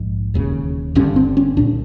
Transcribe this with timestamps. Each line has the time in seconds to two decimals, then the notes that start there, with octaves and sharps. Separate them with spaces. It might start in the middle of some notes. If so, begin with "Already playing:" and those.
Already playing: A#1 G#2
0.34 E1 D#2 C#3
0.95 G1 G2 D3 C#4
1.16 C4
1.37 C#4
1.57 C2 A#2 D4